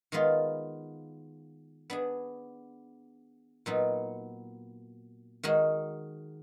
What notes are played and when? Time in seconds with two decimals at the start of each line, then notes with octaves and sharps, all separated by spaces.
0.12 D#3 G#3 B3 F4
1.90 B3 D4 G#4
3.66 A#2 F#3 B3 D#4
5.43 D#3 G#3 D#4 F#4